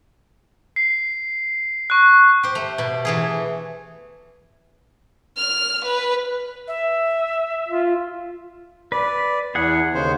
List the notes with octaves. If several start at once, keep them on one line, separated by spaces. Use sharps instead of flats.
C7
C#6 F#6
G4 C5
A3
B2 B5
E3 A3 G#4
F6
B4
E5
F4
B4 D5
E2 B3 G#4 F#5
D#2 C#3 C5